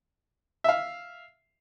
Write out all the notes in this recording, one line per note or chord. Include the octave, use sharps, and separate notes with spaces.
E5 F5